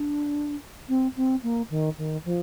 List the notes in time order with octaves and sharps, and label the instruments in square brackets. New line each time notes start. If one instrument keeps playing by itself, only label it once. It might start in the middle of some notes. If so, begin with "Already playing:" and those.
Already playing: [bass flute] D4
C4
C4
A#3
D#3
D#3
F3